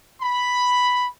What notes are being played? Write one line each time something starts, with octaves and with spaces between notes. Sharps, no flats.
B5